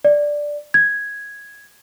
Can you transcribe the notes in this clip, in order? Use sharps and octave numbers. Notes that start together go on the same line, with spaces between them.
D5
G#6